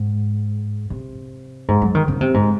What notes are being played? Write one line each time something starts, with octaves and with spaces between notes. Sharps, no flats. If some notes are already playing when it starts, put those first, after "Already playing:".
Already playing: G#2
C3
G#2
F#3
D#3
C#3
C3
G#2